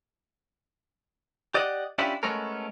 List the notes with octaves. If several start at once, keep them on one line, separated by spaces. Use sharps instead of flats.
G4 D5 D#5 F#5
C#4 D4 E4 F4 G4
G#3 A3 B3 C#4 A4 A#4